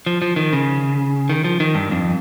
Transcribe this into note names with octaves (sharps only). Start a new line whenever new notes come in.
F3
F3
D#3
C#3
D#3
F3
D#3
G2
F2